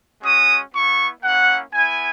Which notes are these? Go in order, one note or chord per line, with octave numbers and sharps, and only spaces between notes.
G#3 C#4 F#4 D#6
B3 E4 C#6
A#3 C#4 E4 F#5
B3 E4 G#5